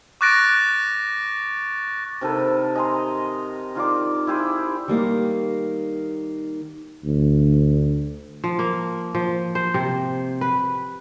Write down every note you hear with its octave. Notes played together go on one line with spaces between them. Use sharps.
C#6 D6 F#6 A6 A#6 D7
C3 D#3 A4 B4
D#5 G#5 A#5 C6
D#3 F4 D5 D6
E4 G4 G#4 C5
D#3 G3 A#3
D2
F3
A#3
F3
C5
C3
B4